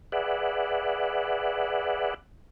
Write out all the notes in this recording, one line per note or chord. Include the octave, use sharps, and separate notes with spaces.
G#4 B4 D5 E5 F#5